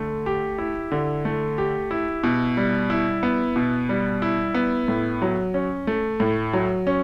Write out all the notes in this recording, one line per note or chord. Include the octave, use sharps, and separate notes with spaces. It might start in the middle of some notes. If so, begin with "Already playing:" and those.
Already playing: D3 A3
G4
E4
D3
A3
G4
E4
B2
G3
E4
B3
B2
G3
E4
B3
A2
F#3
C#4
A3
A2
F#3
C#4